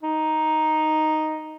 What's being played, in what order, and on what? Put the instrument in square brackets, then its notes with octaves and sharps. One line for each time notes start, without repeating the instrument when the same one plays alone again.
[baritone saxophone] D#4